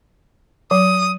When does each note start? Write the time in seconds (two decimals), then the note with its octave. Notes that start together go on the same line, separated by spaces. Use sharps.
0.71 F#3 D#6